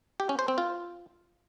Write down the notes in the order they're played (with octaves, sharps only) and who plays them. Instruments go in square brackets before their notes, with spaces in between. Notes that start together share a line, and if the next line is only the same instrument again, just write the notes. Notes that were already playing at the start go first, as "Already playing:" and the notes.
[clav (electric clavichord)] G4
C#4
C5
C4
F4